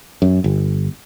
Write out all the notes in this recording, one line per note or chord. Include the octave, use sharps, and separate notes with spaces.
F#2
G1